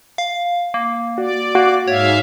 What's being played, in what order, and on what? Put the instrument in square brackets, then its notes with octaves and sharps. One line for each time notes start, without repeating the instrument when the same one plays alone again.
[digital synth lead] F5
A#3
[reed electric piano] F#4 [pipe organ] D5
[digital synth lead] A#3 [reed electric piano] F#4
[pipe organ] G#2 E5 F5 [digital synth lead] C#5